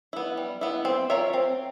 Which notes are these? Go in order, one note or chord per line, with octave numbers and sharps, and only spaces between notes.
B3 E4
G3
B3 E4
C4
F4 A#4 C#5 E5
C4